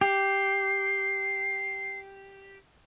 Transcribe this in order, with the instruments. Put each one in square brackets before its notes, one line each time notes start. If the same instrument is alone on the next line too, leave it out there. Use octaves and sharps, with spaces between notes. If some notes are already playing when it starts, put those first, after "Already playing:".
[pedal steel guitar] G4 [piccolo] C7